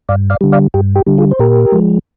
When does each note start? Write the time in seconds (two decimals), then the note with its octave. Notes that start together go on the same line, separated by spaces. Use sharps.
0.09 G2 D5 F5
0.30 D5 F5
0.41 D3 G3
0.52 D5 F5
0.74 G2 G4
0.96 G4
1.06 D3 G3
1.18 F4 G#4
1.31 C5
1.39 A#2 G4 A#4
1.72 F3 G#3